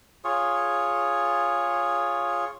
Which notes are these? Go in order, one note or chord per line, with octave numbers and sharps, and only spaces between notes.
F4 G#4 C#5